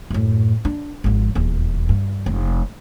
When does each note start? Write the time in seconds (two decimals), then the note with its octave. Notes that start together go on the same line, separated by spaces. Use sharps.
0.10 F#2 A2
0.65 D4
1.04 G#1 F3
1.35 D#1 E2
1.89 G2
2.26 F1